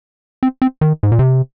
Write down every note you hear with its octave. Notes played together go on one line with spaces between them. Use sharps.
C4
C4
D#3
G#2
A#2
C3